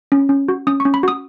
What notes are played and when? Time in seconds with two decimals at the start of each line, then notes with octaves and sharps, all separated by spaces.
0.12 C#4
0.29 C#4
0.49 F#4
0.67 C#4 D#6
0.80 C#6
0.85 C#4
0.94 B5
1.03 F#4 D#6